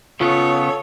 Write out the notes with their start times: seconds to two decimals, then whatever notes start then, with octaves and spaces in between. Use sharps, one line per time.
0.21 C#3 B3 F4 A4 C#5